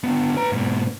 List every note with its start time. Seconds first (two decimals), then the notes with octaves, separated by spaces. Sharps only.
0.04 D3 B3
0.37 B4 A#5
0.52 G#2 B2